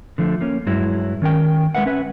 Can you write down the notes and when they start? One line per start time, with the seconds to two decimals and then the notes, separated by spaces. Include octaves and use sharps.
0.18 D3 F3 A3
0.41 A#3 C#4
0.67 G2 F#3 G#3 E4
1.22 D#3 C#4 A#4 G5
1.75 G#3 A3 B4 E5 F#5
1.86 C#4 B4 E5